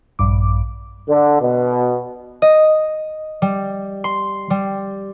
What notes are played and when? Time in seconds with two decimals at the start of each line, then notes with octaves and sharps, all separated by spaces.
0.19 A#1 G2 D6
1.09 D3
1.41 B2
2.42 D#5
3.42 G3
4.04 C6
4.50 G3